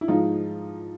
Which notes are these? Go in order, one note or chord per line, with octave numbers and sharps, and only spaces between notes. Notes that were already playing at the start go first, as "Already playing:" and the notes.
E4
G#2 F3 G#3 D#4 F4